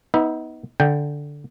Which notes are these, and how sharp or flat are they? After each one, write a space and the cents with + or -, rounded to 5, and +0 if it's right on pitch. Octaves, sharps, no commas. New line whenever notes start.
B3 +0 D#4 +30 E5 +0
D3 -5 G5 +0